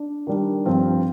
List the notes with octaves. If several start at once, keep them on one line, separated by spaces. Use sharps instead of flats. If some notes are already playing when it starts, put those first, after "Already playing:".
Already playing: D4
D#3 G3 D4
G2 F3 C4 F4